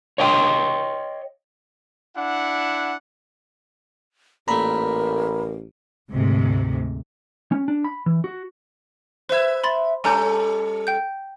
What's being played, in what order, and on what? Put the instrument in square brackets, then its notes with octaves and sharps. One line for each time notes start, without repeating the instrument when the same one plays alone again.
[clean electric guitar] C#5 D#5 F5 G5 A5 C6
[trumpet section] D4 E4 F#5
[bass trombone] A1 [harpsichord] A#2 A3 [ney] A#4 [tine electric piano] A#5 B5
[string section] D2 G#2 C3
[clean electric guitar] C#4
D4
B5
E3
F#4
[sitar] B4 E5 [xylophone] C5 G#6
[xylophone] B5 C6 A6
[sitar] G3 C#4 A4 [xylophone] G#5 A#5 G6
[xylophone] G5 G6